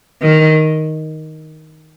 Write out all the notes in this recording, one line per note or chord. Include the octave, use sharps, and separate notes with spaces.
D#3